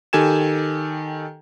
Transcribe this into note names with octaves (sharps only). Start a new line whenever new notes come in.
D#3 G4 A4 G#5 G#6 E7